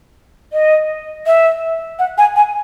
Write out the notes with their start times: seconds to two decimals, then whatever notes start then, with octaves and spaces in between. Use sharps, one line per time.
0.53 D#5
1.26 E5
1.99 F#5
2.18 G#5
2.36 G#5